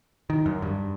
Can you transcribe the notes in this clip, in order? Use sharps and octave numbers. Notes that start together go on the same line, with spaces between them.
D#3
F#2
G2